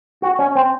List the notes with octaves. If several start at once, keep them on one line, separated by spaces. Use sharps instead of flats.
F#4
C#4
C4